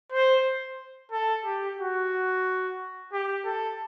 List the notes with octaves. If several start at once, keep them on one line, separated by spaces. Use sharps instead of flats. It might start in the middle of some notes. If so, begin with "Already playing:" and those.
C5
A4
G4
F#4
G4
A4